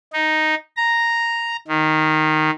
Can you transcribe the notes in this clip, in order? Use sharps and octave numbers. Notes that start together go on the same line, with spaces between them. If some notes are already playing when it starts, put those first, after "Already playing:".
D#4
A#5
D#3